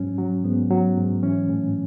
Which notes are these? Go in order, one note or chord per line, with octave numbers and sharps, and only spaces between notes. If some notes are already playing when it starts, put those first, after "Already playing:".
Already playing: G#2 F#3 C#4
F#3
G#2 B3
F#3
G#2
E3 C#4
A2